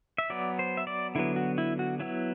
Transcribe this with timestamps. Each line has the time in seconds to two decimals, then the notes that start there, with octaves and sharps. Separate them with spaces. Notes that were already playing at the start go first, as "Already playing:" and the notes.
0.18 E5
0.30 F#3 B3 D5
0.59 C5
0.77 E5
0.87 D5
1.15 D3 F#3 B3 E4
1.36 F#4
1.58 E4
1.79 F#4
2.00 F#3 B3 E4